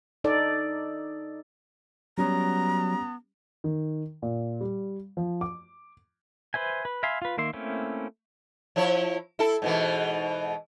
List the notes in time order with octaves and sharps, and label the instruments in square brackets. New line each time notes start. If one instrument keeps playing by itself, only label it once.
[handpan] D#4 A4 D5
[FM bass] F#3 [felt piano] G3 C#4 [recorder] B3 [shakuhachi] A#5
[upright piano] D#3
A#2
G3
F3
D6
[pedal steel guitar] B4 C5 E5 G#5
B4
E5 F5 G#5 B5 C6
F4 B4
D#3 A#3 E5 C6
A3 A#3 C4 C#4 E4
[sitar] F3 E4 C#5
E4 A4
G#2 B2 E3